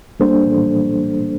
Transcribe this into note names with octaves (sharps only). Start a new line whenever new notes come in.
G3 A#3 D4 A4 C5